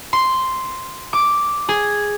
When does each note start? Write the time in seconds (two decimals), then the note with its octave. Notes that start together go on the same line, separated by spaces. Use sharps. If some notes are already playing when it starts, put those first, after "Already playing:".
0.13 C6
1.13 D6
1.69 G#4